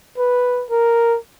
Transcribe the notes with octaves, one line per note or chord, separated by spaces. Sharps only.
B4
A#4